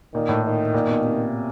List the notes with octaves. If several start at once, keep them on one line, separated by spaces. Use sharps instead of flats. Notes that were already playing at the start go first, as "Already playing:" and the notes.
A#2 D#3
A2
D#3
A#2
B2
C3